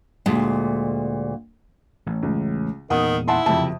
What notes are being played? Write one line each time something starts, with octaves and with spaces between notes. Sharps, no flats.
D2 A#2 G#3
A1
C#2
E2 A#2 D#3 B3 F#5 D#6
E4 F#5 A5 C6
F#1 F2 C3 A5